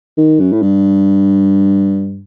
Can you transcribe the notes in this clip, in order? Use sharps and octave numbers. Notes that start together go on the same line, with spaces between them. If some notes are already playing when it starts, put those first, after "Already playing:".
D#3
F#2
A2
G2